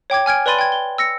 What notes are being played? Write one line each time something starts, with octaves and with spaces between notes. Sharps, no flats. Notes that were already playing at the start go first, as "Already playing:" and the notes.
C#5 G5 D6 G#6
G#5 F6 G#6 D7
B4 D5 B5 C6 A6 D#7
G5 G#6
G7
E6 A#6 C#7